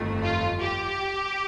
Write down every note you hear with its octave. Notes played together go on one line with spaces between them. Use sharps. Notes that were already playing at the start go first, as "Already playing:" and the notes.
Already playing: G1 F2 D#3 A3
F4
G4